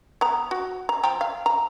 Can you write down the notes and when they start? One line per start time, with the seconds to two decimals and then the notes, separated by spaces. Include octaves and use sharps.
0.21 B3 A#5
0.51 F#4
0.89 A#5
1.03 F3 G5 A#5
1.21 F5
1.46 A#5